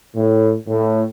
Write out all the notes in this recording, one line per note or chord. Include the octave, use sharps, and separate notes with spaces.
A2
A2